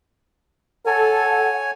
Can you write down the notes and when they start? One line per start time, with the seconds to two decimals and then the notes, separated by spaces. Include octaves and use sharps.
0.86 A4 C#5 F#5 G#5